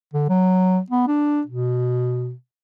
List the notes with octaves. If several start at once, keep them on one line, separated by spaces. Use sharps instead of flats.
D3
F#3
B3
D4
B2